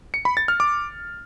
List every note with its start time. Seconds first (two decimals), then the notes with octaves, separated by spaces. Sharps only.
0.14 C#7
0.25 B5
0.37 A6
0.48 F6
0.60 D6